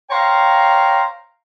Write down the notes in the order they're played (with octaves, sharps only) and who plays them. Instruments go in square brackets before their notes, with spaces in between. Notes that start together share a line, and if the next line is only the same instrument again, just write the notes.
[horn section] C5 C#5 F5 G5 A#5